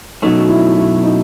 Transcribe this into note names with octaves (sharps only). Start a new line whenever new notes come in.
B2 F#3 A3 C#4 D#4
E4
E4
D#4